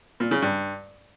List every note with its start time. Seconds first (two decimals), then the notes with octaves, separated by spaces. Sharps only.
0.20 A#2
0.31 C#3
0.42 G2